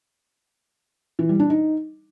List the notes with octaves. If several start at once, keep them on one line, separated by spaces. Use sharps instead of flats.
E3
G3
D4
D#4